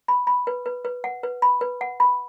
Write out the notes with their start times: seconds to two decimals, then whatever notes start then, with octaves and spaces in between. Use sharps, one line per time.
0.08 B5
0.27 B5
0.47 B4
0.66 B4
0.85 B4
1.04 F#5
1.23 B4
1.42 B5
1.61 B4
1.81 F#5
2.00 B5